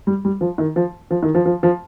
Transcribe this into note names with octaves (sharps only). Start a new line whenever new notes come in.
G3
G3
F3
D#3
F3
F3
D#3
F3
F3
F3